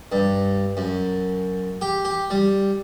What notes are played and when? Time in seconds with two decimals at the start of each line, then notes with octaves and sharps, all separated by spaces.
0.12 G2
0.77 F#2
1.81 G4
2.05 G4
2.30 G3